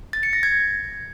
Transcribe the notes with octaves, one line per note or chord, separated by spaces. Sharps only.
A6
C#7
A#6
G#6